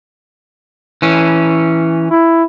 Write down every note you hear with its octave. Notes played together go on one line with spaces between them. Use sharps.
E3 C#4
E4